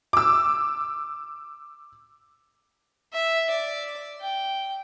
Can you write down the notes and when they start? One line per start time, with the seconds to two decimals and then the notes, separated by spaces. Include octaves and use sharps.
0.13 D6 E6
3.13 E5
3.50 D5
4.21 G5